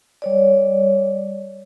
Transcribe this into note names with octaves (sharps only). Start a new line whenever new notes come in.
G3 C#5 D5